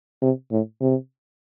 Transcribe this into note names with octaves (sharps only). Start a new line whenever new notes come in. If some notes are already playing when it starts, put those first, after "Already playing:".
C3
A2
C3